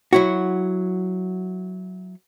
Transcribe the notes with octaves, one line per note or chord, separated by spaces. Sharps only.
F#3 E4 F#4